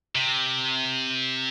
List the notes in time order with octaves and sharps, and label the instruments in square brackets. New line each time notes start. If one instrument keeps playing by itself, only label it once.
[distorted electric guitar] C3